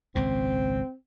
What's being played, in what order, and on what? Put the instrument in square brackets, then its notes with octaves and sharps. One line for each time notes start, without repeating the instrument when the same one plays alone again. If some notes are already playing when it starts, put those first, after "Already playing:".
[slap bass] G#1 C#2 A#2 [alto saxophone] C4